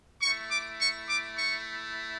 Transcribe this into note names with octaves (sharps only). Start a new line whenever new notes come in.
A3 E4 C#6
D6
C#6
D6
C#6